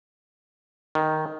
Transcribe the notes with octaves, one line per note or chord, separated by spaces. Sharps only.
D#3